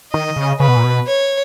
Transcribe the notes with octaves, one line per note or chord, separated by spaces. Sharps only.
D#3 D#5
C#3
C#3 B4
B2
A#2
B2
C#5